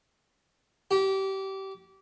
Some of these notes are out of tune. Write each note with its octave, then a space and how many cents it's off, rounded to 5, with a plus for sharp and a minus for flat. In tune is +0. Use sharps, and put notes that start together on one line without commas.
G4 -25